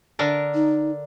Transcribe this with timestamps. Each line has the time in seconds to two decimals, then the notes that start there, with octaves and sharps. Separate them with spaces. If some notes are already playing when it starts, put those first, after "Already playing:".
0.19 D3 D4 A#4
0.55 D#4